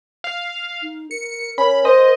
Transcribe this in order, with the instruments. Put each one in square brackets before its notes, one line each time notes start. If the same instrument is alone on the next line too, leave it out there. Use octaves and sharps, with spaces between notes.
[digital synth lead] F5
[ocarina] D#4
[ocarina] A#4 [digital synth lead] C#7
[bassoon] C#4 [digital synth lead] B5
[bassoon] C5 [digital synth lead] D#5